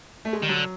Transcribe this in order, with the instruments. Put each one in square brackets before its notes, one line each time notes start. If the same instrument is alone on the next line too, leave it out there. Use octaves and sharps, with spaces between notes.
[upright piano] A3
G#3
[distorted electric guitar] D#3 [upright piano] G3
[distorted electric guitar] D3 [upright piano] F#3